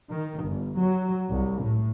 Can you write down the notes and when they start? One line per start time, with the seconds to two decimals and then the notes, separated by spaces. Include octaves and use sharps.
0.10 D#3
0.44 G1
0.77 F#3
1.29 C2
1.61 A2